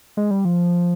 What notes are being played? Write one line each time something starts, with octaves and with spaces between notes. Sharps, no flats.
G#3
G3
F3